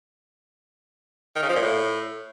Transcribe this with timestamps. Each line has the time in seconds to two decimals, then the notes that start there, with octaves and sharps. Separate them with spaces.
1.36 D#3
1.42 C#3
1.49 F3
1.56 A#2
1.62 A2